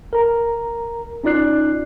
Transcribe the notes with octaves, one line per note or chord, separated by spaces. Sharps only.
A#4 A#5
C#4 D#4 F4 D5 F#6 C7